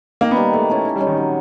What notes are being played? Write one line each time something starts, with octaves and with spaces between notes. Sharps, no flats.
D#3 A#3
B3
G3 A#3
G#3 A3
C#4 E4 A4
D#3
G3
G#3 C#4
D#3
F#3